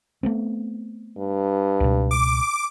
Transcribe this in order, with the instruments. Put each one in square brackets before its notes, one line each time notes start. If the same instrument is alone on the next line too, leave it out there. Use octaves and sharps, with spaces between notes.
[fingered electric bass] A3 B3 C4
[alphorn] G2
[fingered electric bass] C#2 B2
[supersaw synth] D6